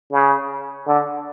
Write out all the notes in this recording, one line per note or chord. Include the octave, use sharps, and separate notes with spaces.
C#3
D3